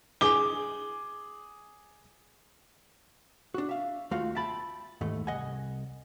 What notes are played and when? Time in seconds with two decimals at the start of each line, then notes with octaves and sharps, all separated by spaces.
0.21 G#4 D6 G7
3.54 D4 F#4
3.69 E5 F5
4.11 D#2 A3 F4 F#4 F5
4.35 E5 G5 A5 B5
5.01 D#2 G#2 E3 A3
5.27 C2 D#5 F#5 G#5